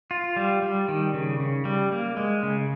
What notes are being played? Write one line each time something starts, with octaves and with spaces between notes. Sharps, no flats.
F4
G3
G3
D#3
C#3
C#3
G3
A#3
G#3
C#3